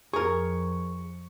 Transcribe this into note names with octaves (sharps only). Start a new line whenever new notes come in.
F2 G#4 A#4 C#6